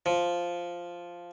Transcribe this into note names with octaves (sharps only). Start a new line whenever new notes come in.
F3